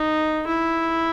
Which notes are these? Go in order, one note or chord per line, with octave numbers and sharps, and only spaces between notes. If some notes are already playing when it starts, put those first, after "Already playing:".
Already playing: D#4
E4